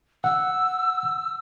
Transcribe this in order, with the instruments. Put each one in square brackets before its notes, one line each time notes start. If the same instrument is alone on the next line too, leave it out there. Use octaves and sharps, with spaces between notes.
[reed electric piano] F#5 [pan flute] E6